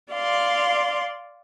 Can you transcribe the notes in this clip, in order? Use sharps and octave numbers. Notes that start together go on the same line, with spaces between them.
D5 F5 C6